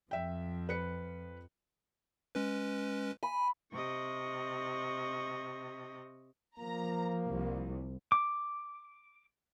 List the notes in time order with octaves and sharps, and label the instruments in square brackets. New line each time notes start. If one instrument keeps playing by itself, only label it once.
[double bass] F2 F3 [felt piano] E5 G5
[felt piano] B4 C#7
[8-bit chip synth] G#3 C#4 B4
[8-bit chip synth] G#5 [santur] B5
[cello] C3 [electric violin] D#5 C#6
[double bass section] F3 [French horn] A#3 [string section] A#5
[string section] C2
[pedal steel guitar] D6